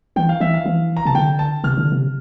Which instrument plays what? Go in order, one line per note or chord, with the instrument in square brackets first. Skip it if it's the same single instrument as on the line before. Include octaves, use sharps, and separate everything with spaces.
[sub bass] E3 [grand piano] G5
[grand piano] F5
[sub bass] E3 [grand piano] E5
[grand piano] F5
[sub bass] E3
[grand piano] A#5
[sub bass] C3 [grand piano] A5
[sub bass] D3 [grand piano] G5
[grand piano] A5
[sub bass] C3 [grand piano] F6
[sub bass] D3
C3